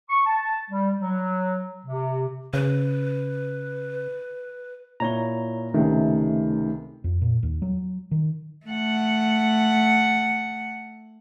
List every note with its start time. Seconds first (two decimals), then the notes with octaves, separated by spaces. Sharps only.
0.10 C#6
0.26 A5
0.71 G3
1.00 F#3
1.86 C3
2.53 C#3 B4
5.00 A#2 E4 C#5 A#5 G7
5.74 C#2 C3 D#3 A3 C#4
7.04 F2
7.22 A#2
7.43 D#2
7.62 F#3
8.11 D#3
8.67 A3 F#5